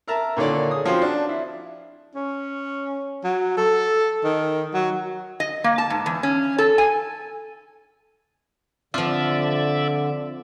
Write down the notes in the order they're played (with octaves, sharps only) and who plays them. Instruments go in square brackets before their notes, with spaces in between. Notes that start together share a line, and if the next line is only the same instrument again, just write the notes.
[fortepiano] A#4 E5 A5 A#5
A#2 D3 D#3 C#5 D5
G#4 D#6
F3 C4 C#4 F#4 C5
D4
E4
[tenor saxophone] C#4
F#3
A4
D#3
F#3
[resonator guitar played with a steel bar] D#5
A#3
A5
G#2
E2
C#4
A4
G#5
[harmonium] D3 [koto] F3 F4 [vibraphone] C4 [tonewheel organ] D5 E5